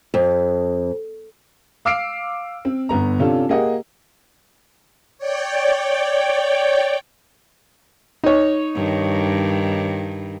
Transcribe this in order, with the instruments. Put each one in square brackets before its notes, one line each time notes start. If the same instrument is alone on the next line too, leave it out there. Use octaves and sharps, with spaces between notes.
[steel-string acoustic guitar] F2
[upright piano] F5 D6 E6 F6 C7 D7
C4
G1 B3 A#5
C3 C#4 D4 F4 A4
A#3 G4 G#4 D#5 F#5
[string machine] C#5 D5 G5
[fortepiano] D#4 C#5
[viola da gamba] G2 D#3